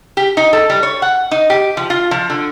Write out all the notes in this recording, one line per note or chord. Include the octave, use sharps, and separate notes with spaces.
G4
D#4
A4
G3
C#5
F#5
D#4
G4
F3
F4
F3
D3